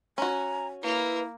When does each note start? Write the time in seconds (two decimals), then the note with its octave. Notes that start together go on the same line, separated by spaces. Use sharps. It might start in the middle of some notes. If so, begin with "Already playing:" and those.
0.18 C#4 F#4 G#5 A#5
0.83 A#3 E4 B4